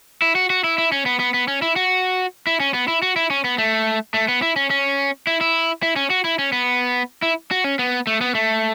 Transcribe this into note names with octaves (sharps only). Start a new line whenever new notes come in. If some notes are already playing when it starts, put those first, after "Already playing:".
E4
F#4
F#4
E4
E4
C#4
B3
B3
B3
C#4
E4
F#4
E4
C#4
B3
E4
F#4
E4
C#4
B3
A3
A3
B3
E4
C#4
C#4
E4
E4
E4
C#4
F#4
E4
C#4
B3
E4
F#4
C#4
B3
A3
B3
A3